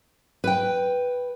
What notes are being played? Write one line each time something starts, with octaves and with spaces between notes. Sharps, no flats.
B4 G5